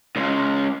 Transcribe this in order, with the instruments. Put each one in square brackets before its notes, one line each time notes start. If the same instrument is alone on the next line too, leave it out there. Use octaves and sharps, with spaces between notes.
[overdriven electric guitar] C#2 C#3